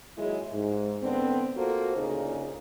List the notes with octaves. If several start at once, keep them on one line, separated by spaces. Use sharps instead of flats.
D#2 F#3 G#3 E4 G#4
G#2
D3 B3 C4
A#3 F4 F#4 A4 C5
D2 A#2 C#3 D#4 G#4